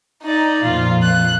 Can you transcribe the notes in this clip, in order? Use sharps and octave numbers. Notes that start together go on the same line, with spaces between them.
D#4 D5
F2 A#2 F3 F4
F#6